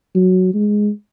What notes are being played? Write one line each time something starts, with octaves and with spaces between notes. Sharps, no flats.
F#3
G#3